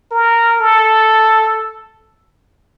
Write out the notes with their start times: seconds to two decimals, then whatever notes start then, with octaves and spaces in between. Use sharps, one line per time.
0.11 A#4
0.60 A4